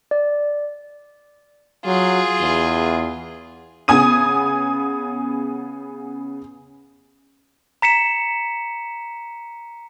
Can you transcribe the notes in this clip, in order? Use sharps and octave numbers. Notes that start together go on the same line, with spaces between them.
D5
F#3 F4 G#4
E2
C#3 B3 G#5 D#6 D#7
A#5 B6 C#7 E7